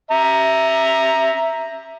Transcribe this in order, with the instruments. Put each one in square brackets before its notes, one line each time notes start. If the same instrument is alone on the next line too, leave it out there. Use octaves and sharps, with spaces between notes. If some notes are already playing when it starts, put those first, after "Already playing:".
[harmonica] E5 A#5